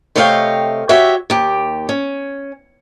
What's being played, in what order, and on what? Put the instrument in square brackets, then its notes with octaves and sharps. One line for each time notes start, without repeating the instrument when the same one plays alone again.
[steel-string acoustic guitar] C3 A3 C#5 D#5 F5 G5
F#4 G4 C#5 E5
D#2 G4
C#4